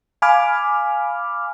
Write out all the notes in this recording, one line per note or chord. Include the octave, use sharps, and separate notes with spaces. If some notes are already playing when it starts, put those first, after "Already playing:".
F5 G#5 B5 D6 F6